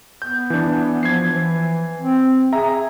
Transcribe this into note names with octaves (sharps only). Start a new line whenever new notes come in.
B3 G6
E3 D4
F3 G#6 C7
E3
C4
G#4 E5 A#5